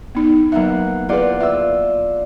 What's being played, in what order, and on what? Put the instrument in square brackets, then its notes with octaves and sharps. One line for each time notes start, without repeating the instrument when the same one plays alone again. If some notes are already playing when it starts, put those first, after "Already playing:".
[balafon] B3 D#4
[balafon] F#3 E5 [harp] A#3 B3 F#5
[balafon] E4 G#4 B4 [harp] F4 D5 F#5
[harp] F4 E6 [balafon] E5